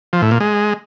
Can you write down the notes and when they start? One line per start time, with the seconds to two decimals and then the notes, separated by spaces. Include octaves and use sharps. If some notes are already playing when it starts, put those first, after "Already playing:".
0.13 F3
0.22 A2
0.31 A#2
0.40 G#3